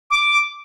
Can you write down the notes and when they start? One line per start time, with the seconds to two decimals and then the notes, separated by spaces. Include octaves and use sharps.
0.11 D6